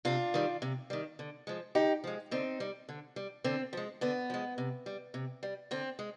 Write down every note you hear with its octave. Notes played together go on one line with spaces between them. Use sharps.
C3 D4 F4
D#3 G3
C3
D#3 G3
D3
F3 G#3
D3 D#4 G4
F3 G#3
D3 C4 D#4
G3
D3
G3
D3 C4
F3 G#3
D3 B3
F3 G#3
C3
G3
C3
G3
D3 C4
G#3